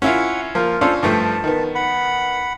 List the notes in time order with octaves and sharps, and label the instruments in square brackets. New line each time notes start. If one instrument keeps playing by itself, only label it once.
[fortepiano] C#4 E4 F4 [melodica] F#5
[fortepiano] F3 A#3 [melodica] F4
[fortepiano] C#4 D4 F4 [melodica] A4 C5
[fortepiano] G2 F3 A3 [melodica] A5
[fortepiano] D#3 B3
[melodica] F#5 B5